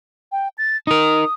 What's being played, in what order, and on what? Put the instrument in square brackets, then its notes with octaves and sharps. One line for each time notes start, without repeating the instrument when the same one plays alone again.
[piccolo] G5
A6
[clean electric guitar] D#4 A#4 [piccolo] D#6